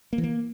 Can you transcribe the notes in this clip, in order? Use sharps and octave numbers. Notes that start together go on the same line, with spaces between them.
A#3
E3
A#3